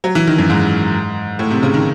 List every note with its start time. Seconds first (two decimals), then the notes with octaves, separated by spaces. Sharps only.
0.04 F#3
0.15 E3
0.27 D#3
0.38 F#2
0.50 G#2
1.39 A2
1.51 C3
1.63 C#3
1.74 D#3